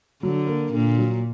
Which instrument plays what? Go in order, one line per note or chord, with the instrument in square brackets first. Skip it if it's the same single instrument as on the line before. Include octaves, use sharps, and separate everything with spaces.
[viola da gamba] D3 [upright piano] F#3
[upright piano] A#3
[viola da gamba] A#2 [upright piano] D3
[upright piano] F#3